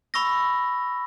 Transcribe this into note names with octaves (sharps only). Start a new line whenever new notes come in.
B5 C#6 E6 A#6